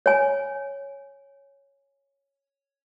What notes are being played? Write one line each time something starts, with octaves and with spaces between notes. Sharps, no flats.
C#5 G#5